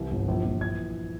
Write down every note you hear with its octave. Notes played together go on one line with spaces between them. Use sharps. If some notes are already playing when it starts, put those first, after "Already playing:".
Already playing: C2 E3
G1
A#1
A#1
E3 G#6